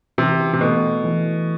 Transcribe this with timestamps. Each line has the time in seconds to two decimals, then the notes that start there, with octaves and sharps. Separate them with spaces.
0.18 C3 E3
0.53 C3
0.61 B2 A3
1.04 E3